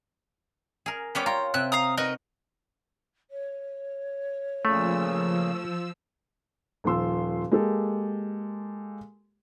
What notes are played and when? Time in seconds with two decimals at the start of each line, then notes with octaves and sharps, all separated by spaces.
0.86 G#4 A#4
1.15 G3 B3 C#4 C#5 G5 D6
1.26 F4 C#5 G5 A#5
1.54 C3 E5 G5 F#6
1.72 F5 A#5 D#6
1.97 D#4 F#4 A#4 B4 D#5
3.30 C#5
4.65 A#2 C#3 F3 A3 E6
6.84 D#1 F3 C6 E6
7.51 G#3 A#3 G4 A4